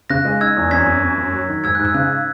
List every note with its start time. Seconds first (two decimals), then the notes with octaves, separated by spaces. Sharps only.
0.10 C#3 F#6 A#6
0.25 G#3
0.41 D#4 E6 G#6
0.56 E2
0.71 F#2 G#6 B6
0.87 F#2
1.02 F#2
1.18 F#2
1.33 F#3
1.48 D#3
1.64 G#2 E6 G#6
1.75 G#2 F#6
1.85 E6
1.94 C#3 F#6